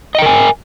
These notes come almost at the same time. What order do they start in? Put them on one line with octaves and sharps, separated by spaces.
D#5 G5 A#4 G#5